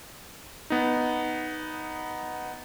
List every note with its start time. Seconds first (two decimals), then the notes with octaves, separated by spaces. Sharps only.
0.70 B3 D#4